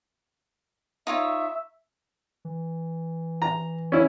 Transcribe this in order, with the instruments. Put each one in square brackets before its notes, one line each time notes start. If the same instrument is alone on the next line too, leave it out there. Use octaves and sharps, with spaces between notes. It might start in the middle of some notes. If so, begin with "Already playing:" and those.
[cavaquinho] D#4 F4 C#5 [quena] E5
[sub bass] E3
[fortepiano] A#5
C#4 E4